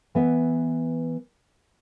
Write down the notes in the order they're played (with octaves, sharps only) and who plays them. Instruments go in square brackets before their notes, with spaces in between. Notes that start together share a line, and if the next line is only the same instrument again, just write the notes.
[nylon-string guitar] E3 B3 E5